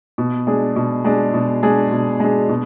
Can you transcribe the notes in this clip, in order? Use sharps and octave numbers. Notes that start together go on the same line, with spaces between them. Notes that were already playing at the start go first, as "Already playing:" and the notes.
B2
G#3 D4 G#4
B2
G#3 D4 G#4
B2
G#3 D4 G#4
B2
G#3 D4 G#4
B2